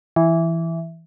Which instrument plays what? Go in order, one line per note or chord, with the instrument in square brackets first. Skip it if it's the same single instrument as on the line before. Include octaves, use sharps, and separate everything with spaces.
[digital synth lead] E3